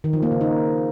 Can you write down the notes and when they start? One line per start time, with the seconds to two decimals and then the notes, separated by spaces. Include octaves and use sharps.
0.04 D#3
0.13 F3
0.23 A#3
0.32 C#3
0.41 D#4